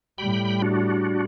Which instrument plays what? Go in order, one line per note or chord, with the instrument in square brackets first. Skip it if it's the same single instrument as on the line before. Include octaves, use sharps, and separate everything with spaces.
[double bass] A2 G3 [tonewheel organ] G5 B5
[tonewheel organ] D4 F#4